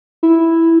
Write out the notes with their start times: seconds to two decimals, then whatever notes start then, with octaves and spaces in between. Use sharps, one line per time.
0.23 E4